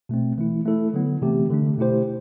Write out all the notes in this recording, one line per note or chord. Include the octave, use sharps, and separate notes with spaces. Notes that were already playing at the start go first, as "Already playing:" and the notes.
B2 A3 C4
E3 A3 E4
A3 E4 A4
D3 F#3 B3
C3 E3 A3 C4 G4
D3 A3 D4
B2 A3 E4 G4 C5